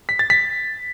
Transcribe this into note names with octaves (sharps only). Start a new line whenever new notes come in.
B6
A6
B6